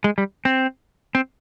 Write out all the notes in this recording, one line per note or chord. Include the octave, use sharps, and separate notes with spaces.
G#3
G3
C4
C4